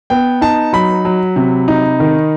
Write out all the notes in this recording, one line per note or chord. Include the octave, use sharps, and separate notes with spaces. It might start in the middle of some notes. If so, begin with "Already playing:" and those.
B3 G5
D#4 A5
F#3 B5
F#3
C3
D#4
D#3